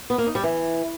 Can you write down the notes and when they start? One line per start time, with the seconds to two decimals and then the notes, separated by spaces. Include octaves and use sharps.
0.10 B3
0.18 A#3
0.27 D#4
0.35 G3
0.43 E3